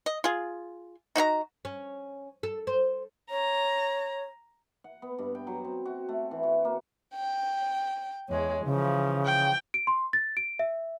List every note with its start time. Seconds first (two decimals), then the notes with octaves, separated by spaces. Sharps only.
0.06 D#5
0.24 F4 G#4
1.16 D#4 F#4 E5 A#5
1.65 C#4
2.43 A4
2.67 C5
3.31 C#5 A#5
4.84 F#5
5.02 B3
5.19 G2
5.35 G5
5.47 F#3
5.65 C4
5.86 F#4
6.09 A3
6.31 E3
6.43 F#4
6.65 A#3
7.15 G5
8.29 E2 G#3 C#5
8.65 C#3 E3 F3
9.25 G5
9.74 D7
9.87 C6
10.13 A6
10.37 D7
10.59 E5